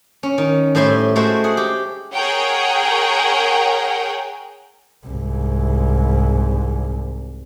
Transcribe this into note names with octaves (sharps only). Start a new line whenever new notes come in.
C#4
D#3
A2 G3 C5 E5 G#5 C6
G#3 A3 F#4 A4 C5
G#4 F#5
G4
G#4 A#4 C#5 F#5 G5
C2 G#2